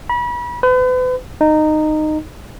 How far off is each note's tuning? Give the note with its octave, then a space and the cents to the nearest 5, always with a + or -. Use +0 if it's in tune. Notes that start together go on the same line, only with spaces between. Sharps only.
B5 -35
B4 +40
D#4 -15